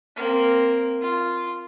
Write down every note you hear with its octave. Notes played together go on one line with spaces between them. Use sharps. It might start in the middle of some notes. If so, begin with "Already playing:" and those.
A#3 C4
F4